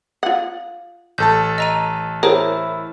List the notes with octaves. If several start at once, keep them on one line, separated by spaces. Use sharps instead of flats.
F4 F#5
A1 A4 A5 G6
D#5 A#5 D#7
E4 G#4 A#4 C5 C#5